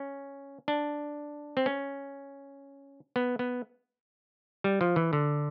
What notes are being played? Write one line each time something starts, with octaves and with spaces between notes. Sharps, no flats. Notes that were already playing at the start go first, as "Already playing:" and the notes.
Already playing: C#4
D4
C4
C#4
B3
B3
G3
F3
E3
D3